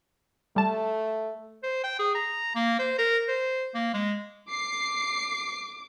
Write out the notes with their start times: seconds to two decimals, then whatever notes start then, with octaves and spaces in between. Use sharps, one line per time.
0.56 G3 A3 A5
1.63 C5
1.84 G5
1.99 G#4
2.15 A#5
2.55 A#3
2.79 C5
2.98 A#4
3.28 C5
3.74 A#3
3.94 G#3
4.49 D6 C7